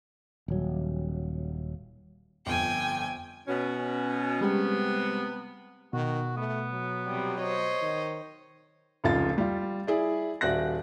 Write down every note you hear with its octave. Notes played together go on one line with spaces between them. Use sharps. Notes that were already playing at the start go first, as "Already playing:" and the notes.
D#1 F#3
G1 F2 G5 G#5
B2 C#4
C3 G3 G#3 B3 G4
B2 D#3 F#4
A3 B3
F#3
C3 G3
C5 C#5 D#5
D#3
F1 C#2 F4 A6
G3 F4
E4 G#4 D5
D#1 F#4 D5 E5 F#6 A#6